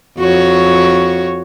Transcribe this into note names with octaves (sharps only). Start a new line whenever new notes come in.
F2 F#4 C#5